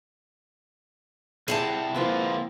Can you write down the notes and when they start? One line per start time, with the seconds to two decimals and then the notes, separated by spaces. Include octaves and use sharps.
1.48 C3 E4 G4 G#4 F#5 A5
1.95 F3 A#3 C4 E4 F4 B4